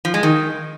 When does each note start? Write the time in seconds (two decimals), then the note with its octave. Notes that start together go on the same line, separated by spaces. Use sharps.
0.05 F3
0.14 G#3
0.23 D#3